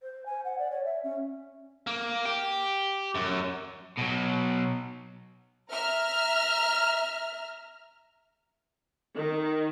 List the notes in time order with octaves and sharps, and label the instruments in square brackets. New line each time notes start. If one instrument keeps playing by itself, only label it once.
[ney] C5
G#5
F#5
D5
C#5
E5
C#4
[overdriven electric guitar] A#3
G4
F#2
B2 F#3
[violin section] E5 A#5 F6
[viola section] D#3